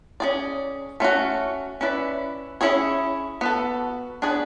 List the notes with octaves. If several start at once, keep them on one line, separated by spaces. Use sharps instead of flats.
C#4 G#4 D5
A3 C#4 F#4
C#4 E4 B4 D5
C#4 E4 G#4 C#5
B3 F#4 A4
B3 D4 G#4 C#5